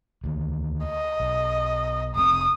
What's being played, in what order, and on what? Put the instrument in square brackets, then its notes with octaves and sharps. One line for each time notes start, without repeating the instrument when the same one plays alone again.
[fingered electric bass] D2 D#3
[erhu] D#5
[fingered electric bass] B1
[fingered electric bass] F1 B2 C4 [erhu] D#6